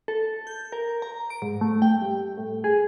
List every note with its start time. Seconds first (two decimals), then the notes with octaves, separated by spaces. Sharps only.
0.08 A4
0.47 G6
0.72 A#4
1.02 A#5
1.30 D7
1.42 G#2
1.61 A3
1.82 G5
2.02 G2
2.37 A2
2.64 G#4